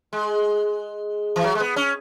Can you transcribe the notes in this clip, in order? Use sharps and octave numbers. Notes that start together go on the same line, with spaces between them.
G#3
E3
F#3
G#3
B3
C#4